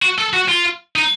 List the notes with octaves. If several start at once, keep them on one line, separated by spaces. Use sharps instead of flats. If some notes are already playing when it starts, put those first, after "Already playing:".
F#4
A4
F#4
F4
D#4